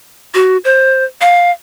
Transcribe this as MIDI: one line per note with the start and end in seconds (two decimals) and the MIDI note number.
0.34 0.57 66
0.65 1.04 72
1.21 1.51 77